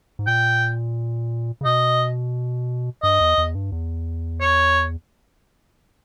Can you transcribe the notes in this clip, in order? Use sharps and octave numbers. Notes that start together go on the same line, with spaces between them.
G#2
A#2 G5
C#3
B2 D#5
G2 D#5
E2
E2
G2
E2
C#5